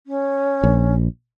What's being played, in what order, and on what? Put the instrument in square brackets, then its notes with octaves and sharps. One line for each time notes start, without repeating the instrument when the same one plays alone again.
[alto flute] C#4
[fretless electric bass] A#1